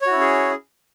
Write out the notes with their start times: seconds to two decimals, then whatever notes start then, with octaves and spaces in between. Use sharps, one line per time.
0.02 C#5
0.06 F#4
0.11 E4
0.16 C#4
0.21 G#4